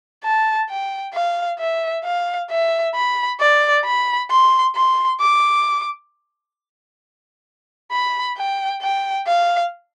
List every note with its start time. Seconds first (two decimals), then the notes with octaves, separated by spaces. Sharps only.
0.24 A5
0.69 G5
1.14 F5
1.59 E5
2.04 F5
2.50 E5
2.95 B5
3.40 D5
3.85 B5
4.30 C6
4.76 C6
5.21 D6
7.92 B5
8.37 G5
8.82 G5
9.27 F5